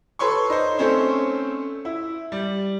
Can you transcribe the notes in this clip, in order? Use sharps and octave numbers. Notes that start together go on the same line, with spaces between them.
A4 B4 C#5 C6 C#6
D#4 C5
A3 C4 C#4 C5 C#5
E4
G3